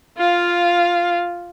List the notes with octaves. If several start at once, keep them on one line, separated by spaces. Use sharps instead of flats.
F4 F5